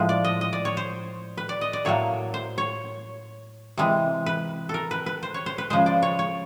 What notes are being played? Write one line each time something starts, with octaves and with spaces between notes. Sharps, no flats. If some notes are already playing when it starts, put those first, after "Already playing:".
Already playing: A2 F3 G#3
D5
D#5
D#5
D5
C#5
C5
B4
D5
D#5
D5
A2 F#3 A#3 C#5
C5
C#5
C3 E3 G#3
B4
A4 A#4
B4
B4
C5
C#5
C5
B4
C#3 F3 G#3 C5
D5
C#5
C#5